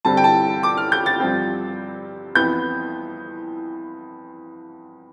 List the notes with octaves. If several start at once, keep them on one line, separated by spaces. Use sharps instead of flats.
G2 D3 G3 C4 A5
G5
A5
D6
F6
G6
A6
G2 F3 C4
F2 E3 B3 G6